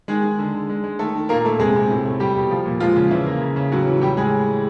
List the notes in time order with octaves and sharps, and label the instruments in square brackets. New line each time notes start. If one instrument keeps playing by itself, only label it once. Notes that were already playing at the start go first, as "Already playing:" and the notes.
[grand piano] D#3 G#3 G#4
G#3
D3
D3
G#3
G#3
D#3 A3 A4
D#3
A#2 A#3 A#4
A#2 A3 A4
C3 G#3 G#4
C3
A2
A3
G3 G4
B2
F3
A#2
F3 G#3 F4
C#3
C#3 E3 E4
A#3
C#3
C#3
A2 F#3 F#4
E3
A2 G3 G4
A2 G#3 G#4